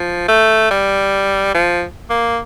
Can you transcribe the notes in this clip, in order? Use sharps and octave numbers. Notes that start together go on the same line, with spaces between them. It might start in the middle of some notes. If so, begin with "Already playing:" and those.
Already playing: F3
A3
G3
F3
A#3